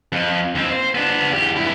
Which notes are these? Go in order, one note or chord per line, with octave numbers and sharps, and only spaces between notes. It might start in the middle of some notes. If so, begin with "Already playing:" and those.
F2
D#2 C4
C5
B3 D4
E2 G4
G2 E4